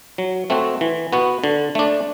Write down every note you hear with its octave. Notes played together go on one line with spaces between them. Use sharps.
F#3
A3 C4 F#4
E3
B3 F#4
D3
A3 D4